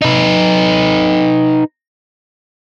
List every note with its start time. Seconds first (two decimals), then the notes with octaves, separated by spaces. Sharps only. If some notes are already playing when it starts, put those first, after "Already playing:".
0.02 D#4 B4